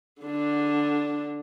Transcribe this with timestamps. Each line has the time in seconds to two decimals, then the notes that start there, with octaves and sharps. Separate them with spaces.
0.22 D3 D4